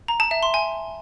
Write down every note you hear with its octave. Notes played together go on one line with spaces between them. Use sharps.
A#5
A5
E5
C6
G#5